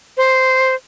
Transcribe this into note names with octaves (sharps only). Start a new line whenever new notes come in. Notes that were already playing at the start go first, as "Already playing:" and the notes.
C5